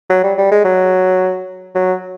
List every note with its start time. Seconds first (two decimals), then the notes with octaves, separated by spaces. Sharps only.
0.09 F#3
0.23 G3
0.38 G3
0.52 G#3
0.65 F#3
1.75 F#3